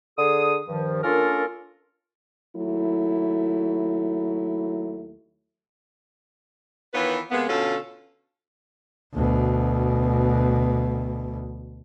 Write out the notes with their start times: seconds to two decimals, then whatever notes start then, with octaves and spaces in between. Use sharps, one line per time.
0.18 D3 G#4 D#6
0.68 G2 D#3 F3
1.03 A#3 C#4 D4 F4 A4 A#4
2.57 D#2 F#3 A3 E4
6.94 D#3 E3 B3 F4 B4 C#5
7.31 C3 G#3 A#3 B3
7.48 B2 D3 C#4 F4 A4
9.15 D2 B2